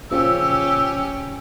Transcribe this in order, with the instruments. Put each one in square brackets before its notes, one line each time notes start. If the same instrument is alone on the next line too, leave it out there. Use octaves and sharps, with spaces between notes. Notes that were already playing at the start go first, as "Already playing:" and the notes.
[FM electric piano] A#2 C#3 F3 [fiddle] C#4 G4 [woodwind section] E6